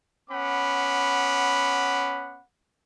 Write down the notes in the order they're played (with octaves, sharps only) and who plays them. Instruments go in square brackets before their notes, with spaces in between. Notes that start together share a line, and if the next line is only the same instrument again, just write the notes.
[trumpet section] B3 C#4 F#5 B5 D6